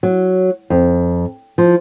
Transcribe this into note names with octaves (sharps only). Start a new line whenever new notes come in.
F#3
F2
F3